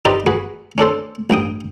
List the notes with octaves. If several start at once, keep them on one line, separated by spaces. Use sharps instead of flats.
D#4 G4 B4 C5 D5 D#5
F#4 G#4 B4
C#4 D4 A4 C5
A1 G2 G5 D#6